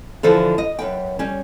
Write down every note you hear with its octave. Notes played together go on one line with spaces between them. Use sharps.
D3 E3 F3 A4 B4 C5
D#5
F#2 B4 G5
G3 C#4